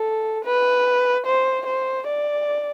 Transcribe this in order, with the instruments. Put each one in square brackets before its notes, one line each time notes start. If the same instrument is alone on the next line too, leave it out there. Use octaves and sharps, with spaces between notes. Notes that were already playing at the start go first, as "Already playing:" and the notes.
Already playing: [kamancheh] A4
B4
C5
C5
D5